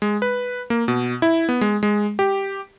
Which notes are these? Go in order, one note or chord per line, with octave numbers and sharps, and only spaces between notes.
G#3
B4
A#3
B2
E4
B3
G#3
G#3
G4